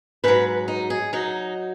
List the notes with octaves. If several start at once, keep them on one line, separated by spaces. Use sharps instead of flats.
G#2 F#3 B4
D#4
G#4
F#3 D#4